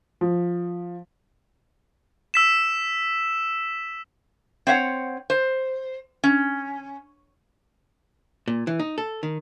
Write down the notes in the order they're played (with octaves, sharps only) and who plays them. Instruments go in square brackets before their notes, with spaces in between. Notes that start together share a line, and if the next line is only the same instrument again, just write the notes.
[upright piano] F3
[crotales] E6 B6 E7
[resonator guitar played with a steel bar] C4 C#5 E5 F#5
C5
C#4
[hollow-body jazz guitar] A#2
E3
D#4
A4
D#3